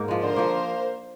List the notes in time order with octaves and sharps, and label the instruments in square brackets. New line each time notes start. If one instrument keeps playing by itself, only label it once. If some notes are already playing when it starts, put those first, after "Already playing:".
Already playing: [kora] G#2 A#3 D#4
F3 G#3
[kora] D3 [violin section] A#4 C5
[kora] F3 A#3